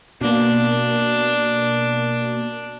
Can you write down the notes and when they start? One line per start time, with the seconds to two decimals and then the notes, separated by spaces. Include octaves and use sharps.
0.21 B2 A#3 D4